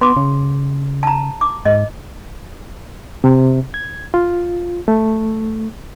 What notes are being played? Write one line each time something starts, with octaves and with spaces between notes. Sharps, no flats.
B3 C6 D6
C#3
A5 A#5
D6
G#2 D#5
C3
G#6
F4
A3